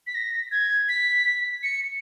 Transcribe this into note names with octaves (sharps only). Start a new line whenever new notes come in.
B6
A#6
G#6
B6
C#7